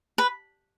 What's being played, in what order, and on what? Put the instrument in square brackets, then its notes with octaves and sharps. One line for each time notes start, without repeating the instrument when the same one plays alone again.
[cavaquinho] B4